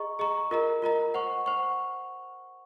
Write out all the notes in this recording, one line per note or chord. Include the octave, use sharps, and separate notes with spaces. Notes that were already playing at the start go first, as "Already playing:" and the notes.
Already playing: G#4 D#5 A#5 C#6
G#4 D#5 A#5 C#6
F4 A#4 D#5 A#5
F4 A#4 D#5 A#5
C5 F#5 C#6
C5 F#5 C#6